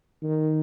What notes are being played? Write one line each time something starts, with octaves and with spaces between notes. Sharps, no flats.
D#3